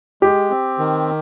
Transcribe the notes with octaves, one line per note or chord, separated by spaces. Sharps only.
G#3 G4
C4
D#3